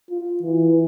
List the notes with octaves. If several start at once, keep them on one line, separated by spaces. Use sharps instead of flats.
F4
E3